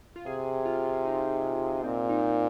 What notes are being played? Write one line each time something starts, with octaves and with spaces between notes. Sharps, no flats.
F4
C3 G#4
F4
D#4
A#2 C4
D#4